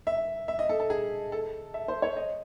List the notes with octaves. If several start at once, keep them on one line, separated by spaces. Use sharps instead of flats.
E5
E5
D#5
A4
A4
G#4
A4
E5
C5
C#5
D#5